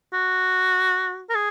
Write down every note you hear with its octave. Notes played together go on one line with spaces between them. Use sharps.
F#4
A#4
G#4